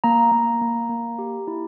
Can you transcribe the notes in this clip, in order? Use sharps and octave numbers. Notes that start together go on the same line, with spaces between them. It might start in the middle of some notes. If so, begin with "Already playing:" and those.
A#3 A#5
A#3
A#3
A#3
G4
E4